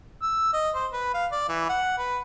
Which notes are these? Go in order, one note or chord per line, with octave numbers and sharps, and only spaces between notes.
E6
D#5
C5
B4
F5
D5
E3
F#5
B4